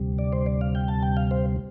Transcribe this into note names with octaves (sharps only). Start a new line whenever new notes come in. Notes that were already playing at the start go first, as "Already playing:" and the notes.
Already playing: D2 C3 G3
D5
C5
D5
F5
G5
A5
G5
F5
C5